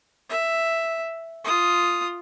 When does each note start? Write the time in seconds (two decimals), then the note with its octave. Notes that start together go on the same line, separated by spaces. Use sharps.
0.30 E5
1.45 F4 D#6